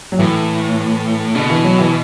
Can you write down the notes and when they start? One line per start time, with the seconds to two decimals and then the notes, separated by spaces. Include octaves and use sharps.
0.12 F#3
0.19 A2 E3
1.35 B2 D3
1.50 E3
1.64 F#3
1.79 E3